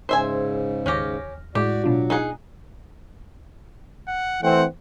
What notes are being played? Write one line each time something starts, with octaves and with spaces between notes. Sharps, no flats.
G#2 C#3 C5 E5 G#5
D#2 C#4 G4 F6 A#6
A2 G#3 E4 F#4 G4 D5
B2 F#3 D4 F4
D#4 G#4 F#5
F#5
E3 A3 C4 F#5